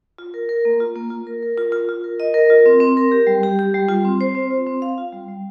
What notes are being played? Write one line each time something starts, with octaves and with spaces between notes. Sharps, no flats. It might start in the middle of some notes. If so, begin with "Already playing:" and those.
F4
A#4
A#4
A#3
F4
A#3
F4
A#4
A#4
F4
F4
F4
A#4
D#5
A#4
F4
C4
C4
A#4
G4
G3
G4
G4
G3
F4
C4
C5
C4
F4
C4
F5
F4
G3
G3